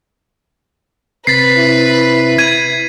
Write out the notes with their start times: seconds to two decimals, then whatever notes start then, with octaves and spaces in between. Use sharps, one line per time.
1.27 C3 C4 B4 A6 B6 C7
1.57 E4
2.38 G#6 D#7